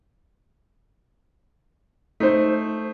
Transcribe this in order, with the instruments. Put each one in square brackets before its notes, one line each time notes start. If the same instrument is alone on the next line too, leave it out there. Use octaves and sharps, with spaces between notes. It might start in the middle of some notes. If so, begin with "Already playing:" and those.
[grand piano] A3 [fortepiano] D#4 C5